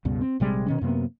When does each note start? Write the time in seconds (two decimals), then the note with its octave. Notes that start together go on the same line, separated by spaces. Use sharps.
0.05 C#2 G2 B2
0.21 C4
0.40 A#1 C3 G3 G#3
0.66 B2 D#3 C#4
0.81 F#2 C3 A#3 B3